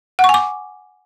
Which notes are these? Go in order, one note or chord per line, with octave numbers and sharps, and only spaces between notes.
F#5
C#6
G#5
D6